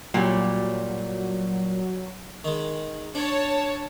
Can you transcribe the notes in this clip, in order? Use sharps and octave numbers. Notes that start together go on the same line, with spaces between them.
A#2 F#3 G3
D#3 G#3
D4 C#5 A5